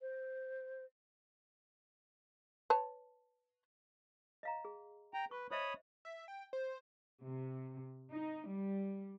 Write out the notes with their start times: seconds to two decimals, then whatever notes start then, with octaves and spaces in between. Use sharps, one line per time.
0.01 C5
2.70 B4 C#5 A5
4.43 D#5 F5 A#5
4.65 G#4
5.14 G5 A#5
5.31 B4 C#6
5.51 C5 C#5 D#5 E5 B5 D#6
6.05 E5
6.28 G5
6.53 C5
7.23 C3
8.12 D#4
8.47 G3